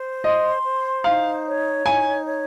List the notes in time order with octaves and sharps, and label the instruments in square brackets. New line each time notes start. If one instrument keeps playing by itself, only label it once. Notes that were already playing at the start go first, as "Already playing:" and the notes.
Already playing: [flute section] C5
[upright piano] D#5 [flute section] C6
[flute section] C5
[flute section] D#4 [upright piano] F5
[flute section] C#5
[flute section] D#4 [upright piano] G#5
[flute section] C#5